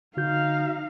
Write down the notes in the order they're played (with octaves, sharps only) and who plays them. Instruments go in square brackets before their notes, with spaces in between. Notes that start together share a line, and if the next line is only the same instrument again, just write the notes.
[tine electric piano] D3 F#4 G6 [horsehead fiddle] D#4 F5